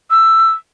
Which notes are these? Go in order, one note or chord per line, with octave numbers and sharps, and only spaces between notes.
E6